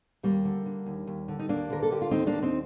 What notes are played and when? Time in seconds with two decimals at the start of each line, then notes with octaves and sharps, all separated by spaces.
0.23 D#2 G3 A#3
0.45 D3
0.66 D3
0.86 D#2
1.07 D#2
1.28 D3
1.39 D#4
1.49 D#2 A#3 D4
1.70 D3 A#4
1.83 A4
1.91 D3 G4
2.02 F4
2.11 D#2 C4 D#4
2.27 A#3 D4
2.32 D#2
2.42 C4 D#4